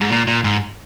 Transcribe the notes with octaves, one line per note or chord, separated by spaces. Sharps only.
G#2
A#2
A#2
G#2